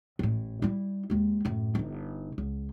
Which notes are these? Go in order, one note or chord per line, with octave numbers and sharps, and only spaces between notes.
A1 A2
G3 E4
D#2 G#3
F#2 A2
G1 D#4
C#2